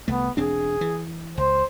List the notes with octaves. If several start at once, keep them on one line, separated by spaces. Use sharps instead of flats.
C2 A3 B3
E1 C4 D4 G#4
E3
C#2 C5